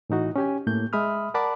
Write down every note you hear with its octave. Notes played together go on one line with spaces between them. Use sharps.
A2 E3 D#4 F#4
C#4 G4 G#5
A2 A3 A#3 G6
G#3 E5 B5 D#6 F6
A#4 D5 F#5 A5 B5 D6